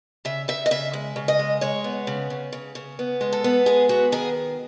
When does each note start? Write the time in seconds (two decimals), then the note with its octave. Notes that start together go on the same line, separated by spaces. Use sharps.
0.25 C#3 E5
0.48 C#3 E5
0.66 D#5
0.71 C#3 E5
0.93 G#3
1.16 C#3
1.28 D#5
1.39 G#3
1.61 G#3 C#5
1.84 B3
2.07 C#3
2.30 C#3
2.52 C#3
2.75 C#3
2.99 B3
3.21 G#3
3.32 A4
3.44 B3
3.66 G#3 G#4
3.89 B3 F#4
4.12 D#3 G#4